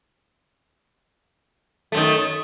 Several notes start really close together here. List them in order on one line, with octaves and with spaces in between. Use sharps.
A3 F#2 D#3